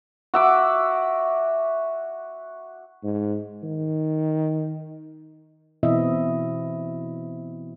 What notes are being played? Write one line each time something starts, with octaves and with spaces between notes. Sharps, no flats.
F#4 E5 D6
G#2
D#3
B2 E3 C4 E4 D#5 E5